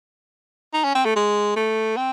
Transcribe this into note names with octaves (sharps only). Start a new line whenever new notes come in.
D#4
C#4
C4
A3
G#3
A3
C4